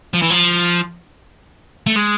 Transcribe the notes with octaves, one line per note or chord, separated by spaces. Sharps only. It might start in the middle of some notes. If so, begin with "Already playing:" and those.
F3
E3
F3
A3
G#3